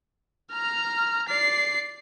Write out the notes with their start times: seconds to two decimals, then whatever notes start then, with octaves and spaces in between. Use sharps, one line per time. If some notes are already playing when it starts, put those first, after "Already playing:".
0.52 A#5 F6
1.28 D5 C7